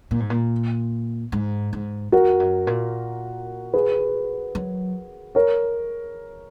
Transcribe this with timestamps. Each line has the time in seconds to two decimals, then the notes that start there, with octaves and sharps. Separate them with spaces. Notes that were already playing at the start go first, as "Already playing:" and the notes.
0.11 A#2
0.20 G#2
0.30 A#2
1.32 G#2
1.73 G#2
2.12 F2 F#4 A#4
2.40 F#2
2.67 A#2
3.74 G#4 B4
4.55 F#3
5.35 A#4 C#5